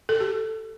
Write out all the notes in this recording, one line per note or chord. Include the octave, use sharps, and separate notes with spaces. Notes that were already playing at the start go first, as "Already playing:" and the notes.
A4
G4